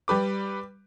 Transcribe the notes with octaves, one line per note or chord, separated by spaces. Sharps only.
G3 G4 B4 D6